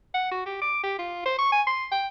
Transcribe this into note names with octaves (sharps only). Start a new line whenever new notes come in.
F#5
F#4
G4
D6
G4
F4
C5
C#6
G#5
C6
G5